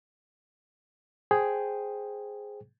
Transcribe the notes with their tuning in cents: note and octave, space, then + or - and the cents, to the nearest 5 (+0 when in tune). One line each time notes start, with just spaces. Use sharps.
G#4 +0 C5 +0 G5 +0